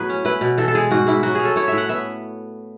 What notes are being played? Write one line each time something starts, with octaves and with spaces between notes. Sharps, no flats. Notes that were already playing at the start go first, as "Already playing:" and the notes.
Already playing: A2 F#3 B3 G#4 B4
C#4
E4 B4
B2
E3 A4
A4
G#3 G#4
G#2 F#4
G#2 E4
F#3 F#4
C#4 G#4
A4
E4 C#5
A2 E5
F#5
B3 E5